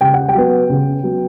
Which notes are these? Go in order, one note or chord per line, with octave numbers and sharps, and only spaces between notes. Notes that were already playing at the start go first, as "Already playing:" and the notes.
C#3 G5
F#5
G5
F#3 B3
C#3
F#3 B3